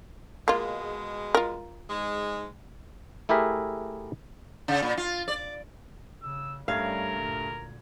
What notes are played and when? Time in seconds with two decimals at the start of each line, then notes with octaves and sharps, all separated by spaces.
0.48 B2 G#3 A#3 F4
1.35 F4 A#4
1.89 G#2 G#3
3.29 A3 E4 G4 G#4 A#4 E5
4.68 C#3
4.82 A#2
4.97 F4
5.28 D5
6.23 C#3 E6
6.68 G2 G3 A3 C#4 A#4 F5 G#6
7.20 D2 A#2